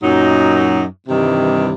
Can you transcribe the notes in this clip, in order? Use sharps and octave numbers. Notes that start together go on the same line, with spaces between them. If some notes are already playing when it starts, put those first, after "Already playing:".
F#2 A#2 F#3 D#4
G2 C3 D#3 E3 G3